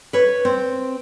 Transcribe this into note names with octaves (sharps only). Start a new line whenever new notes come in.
B4 C#5
C4